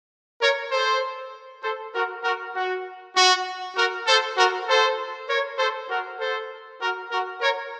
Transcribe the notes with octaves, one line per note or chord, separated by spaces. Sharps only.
A#4 C#5
A4 C5
A4 C5
F#4 A#4
F#4 A#4
F#4
F#4
F#4 A#4
A4 C5
F#4 A#4
A4 C5
A#4 C#5
A4 C5
F#4 A#4
A4 C5
F#4 A#4
F#4 A#4
A#4 C#5